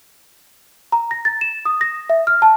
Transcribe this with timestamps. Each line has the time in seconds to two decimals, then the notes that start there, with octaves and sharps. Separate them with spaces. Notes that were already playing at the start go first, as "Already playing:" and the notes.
0.92 A#5
1.11 A#6
1.25 A6
1.41 E7
1.65 D#6
1.81 A#6
2.10 E5
2.27 F6
2.42 A5